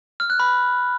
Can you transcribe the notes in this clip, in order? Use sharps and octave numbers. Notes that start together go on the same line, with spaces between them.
F6
F#6
B5